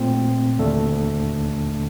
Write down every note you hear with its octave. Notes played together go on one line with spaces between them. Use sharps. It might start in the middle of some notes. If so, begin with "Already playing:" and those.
Already playing: A#2 A3 C4
D#2 D3 A3 D4 A4